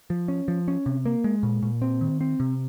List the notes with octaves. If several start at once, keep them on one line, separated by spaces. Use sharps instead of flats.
F3
C#4
F3
C#4
C3
A#3
G#3
A#2
A#2
C4
D#3
C4
C3